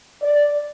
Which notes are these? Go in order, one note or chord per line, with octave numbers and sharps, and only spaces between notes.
D5